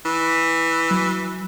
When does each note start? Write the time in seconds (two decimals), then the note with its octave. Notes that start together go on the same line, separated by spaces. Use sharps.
0.06 E3
0.91 F#3